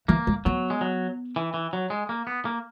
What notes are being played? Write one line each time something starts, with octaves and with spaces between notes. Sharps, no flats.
E3 A#3
G#3
F#3 B3
G#3
F#3
E3
E3
F#3
G#3
A#3
B3
A#3